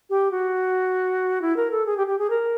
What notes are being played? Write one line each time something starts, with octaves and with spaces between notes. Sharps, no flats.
G4
F#4
E4
A#4
A4
G#4
G4
G4
G#4
A#4